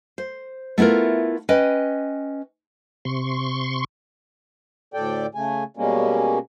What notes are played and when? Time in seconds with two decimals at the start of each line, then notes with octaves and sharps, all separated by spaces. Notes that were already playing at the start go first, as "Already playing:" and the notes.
0.18 C5
0.78 A3 B3 E4 F4 A#4
1.49 C#4 B4 D#5 G5
3.05 C3 C6 C#6
4.94 D2 A2 A4 D5 G5
5.35 C#3 A3 G#5
5.77 B2 G3 G#3 A#3 C#4